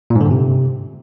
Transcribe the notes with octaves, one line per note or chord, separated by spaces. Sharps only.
A#2
G#2
D3
G2
C3